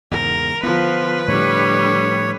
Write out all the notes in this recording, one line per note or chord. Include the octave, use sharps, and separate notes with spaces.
E2 G#2 C#3 A#4
D3 F3 B3 B4
A2 D3 F3 G3 C#5